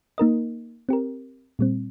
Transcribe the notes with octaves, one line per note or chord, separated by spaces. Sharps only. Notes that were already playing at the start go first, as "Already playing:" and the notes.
A#3 D#4 A#4 D#5
C4 G4 A#4
A#2 G3 C4